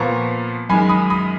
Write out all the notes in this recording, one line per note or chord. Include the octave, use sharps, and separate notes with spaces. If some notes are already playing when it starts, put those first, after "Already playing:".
Already playing: A#2 F3 B3 A#5 C#6
F#2 D#3 G#3 G#5 B5
B5 D#6
B5 D#6